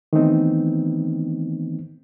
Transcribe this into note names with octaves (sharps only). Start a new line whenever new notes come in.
D#3 E3 A3 B3 C4 D#4